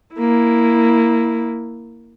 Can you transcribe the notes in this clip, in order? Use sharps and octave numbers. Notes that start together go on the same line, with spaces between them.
A#3 E4